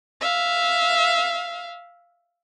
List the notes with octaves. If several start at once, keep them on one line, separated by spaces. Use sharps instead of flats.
E5 F5